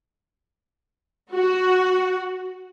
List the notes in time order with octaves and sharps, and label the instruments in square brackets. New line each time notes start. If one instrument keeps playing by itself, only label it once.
[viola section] F#4